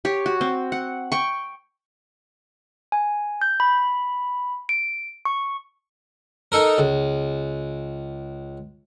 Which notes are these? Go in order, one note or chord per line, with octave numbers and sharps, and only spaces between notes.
G4 C#5
F#4
C4
F#5
G5 C#6
G#5
G6
B5
D7
C#6
D#4 A4 A#4
C#2